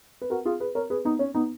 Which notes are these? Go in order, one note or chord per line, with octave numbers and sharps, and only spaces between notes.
B4
F#4 A#4
F4 G#4
G#4 B4
A#4 C#5
G#4 B4
B3 D#4
C#4
B3 D#4